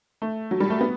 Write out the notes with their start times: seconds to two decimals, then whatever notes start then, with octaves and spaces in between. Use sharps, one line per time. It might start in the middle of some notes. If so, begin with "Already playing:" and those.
0.22 A3
0.51 F#3
0.60 G3
0.70 A3
0.81 B3